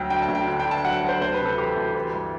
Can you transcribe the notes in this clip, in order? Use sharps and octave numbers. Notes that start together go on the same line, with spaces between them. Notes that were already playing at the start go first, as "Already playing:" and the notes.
Already playing: D2 F#3 G5
D3 G5
A5
D2
G5
D3
G5
D3
A5
F#3 F#5
F#3
C5
D2 C5
B4
C3
A4
E3 G4
D2
E3
G2